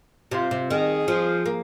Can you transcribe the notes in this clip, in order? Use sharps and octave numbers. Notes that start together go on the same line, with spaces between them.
C3 F4
C3
D#3 G#4
F3
A#3